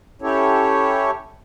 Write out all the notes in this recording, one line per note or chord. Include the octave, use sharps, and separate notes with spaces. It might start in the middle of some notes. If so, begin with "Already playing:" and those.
C#4 E4 G4 A4 C#5